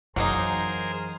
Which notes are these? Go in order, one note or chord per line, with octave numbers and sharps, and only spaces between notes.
F#2 E3 F#3 A#3 D#4 G#4 A#4 C5